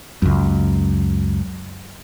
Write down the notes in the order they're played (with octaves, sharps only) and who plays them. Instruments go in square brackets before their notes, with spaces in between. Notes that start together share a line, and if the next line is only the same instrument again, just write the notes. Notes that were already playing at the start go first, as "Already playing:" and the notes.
[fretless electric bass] C#2 F#2